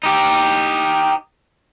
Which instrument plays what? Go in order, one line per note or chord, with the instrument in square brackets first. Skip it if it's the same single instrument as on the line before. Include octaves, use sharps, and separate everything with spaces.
[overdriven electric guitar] D#4 G4